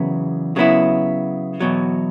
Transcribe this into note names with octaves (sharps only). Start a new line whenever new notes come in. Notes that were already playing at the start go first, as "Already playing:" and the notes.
Already playing: E2 C#3 F#3 B3
C#3 F#3 B3 E4
E2 B2 F#3